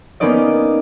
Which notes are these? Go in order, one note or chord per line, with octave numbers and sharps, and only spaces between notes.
A#3 B3 C#4 D#4 D5 D#5